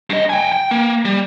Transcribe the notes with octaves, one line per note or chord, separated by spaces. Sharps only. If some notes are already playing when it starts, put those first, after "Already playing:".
G2 D#5
G5 G#5
G5
A#3
G3